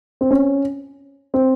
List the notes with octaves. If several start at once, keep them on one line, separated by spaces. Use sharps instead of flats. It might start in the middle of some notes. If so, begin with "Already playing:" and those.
C4
C#4
C4